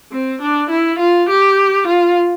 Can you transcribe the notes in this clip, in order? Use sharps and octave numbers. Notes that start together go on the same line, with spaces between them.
C4
D4
E4
F4
G4
F4